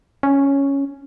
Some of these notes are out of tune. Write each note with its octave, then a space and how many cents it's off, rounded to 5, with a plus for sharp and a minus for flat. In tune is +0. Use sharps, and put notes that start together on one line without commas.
C#4 +0